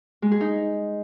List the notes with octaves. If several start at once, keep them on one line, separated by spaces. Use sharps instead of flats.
G#3
G#4
D#4